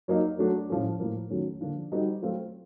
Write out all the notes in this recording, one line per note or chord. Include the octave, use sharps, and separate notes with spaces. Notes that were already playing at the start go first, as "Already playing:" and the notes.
F#3 A#3 D#4
F#3 A3 D4 F#4 A4
A2 F3 A3 C#4
A2 F3 A#3
D#3 F#3 A3 C#4 F#4
D3 F3 A#3 D4 F4
G3 C4 D#4 F#4 A4
F#3 A3 C4 F4 A4